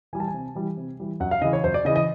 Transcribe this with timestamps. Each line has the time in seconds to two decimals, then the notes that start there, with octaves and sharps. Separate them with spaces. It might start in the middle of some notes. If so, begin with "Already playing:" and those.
0.13 E3 G3 G#5
0.20 A5
0.28 G#5
0.34 C3
0.55 E3 G3
0.77 C3
1.00 E3 G3
1.20 F#2 F#5
1.31 F5
1.42 C#3 E3 D#5
1.53 C#5
1.64 F#2 C5
1.74 D5
1.85 C#3 D#5
1.89 E3
1.96 D#5